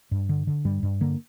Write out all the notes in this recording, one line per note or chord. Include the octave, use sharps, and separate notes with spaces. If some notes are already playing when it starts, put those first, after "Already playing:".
G2
D3
D3
G2 G3
G2
D3 A#3